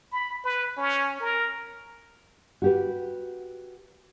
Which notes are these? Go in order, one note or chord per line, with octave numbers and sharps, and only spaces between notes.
B5
B4
C#4
A#4
F#4 G4 B4